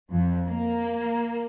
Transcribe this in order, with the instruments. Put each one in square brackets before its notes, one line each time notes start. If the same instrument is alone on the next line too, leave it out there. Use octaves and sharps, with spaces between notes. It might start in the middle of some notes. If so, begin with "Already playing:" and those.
[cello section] F2
A#3